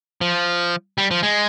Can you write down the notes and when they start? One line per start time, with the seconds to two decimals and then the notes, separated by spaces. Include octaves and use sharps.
0.21 F3
0.98 G3
1.11 F3
1.23 G#3